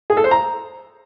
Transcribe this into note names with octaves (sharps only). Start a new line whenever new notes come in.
G#4
A4
C5
A#5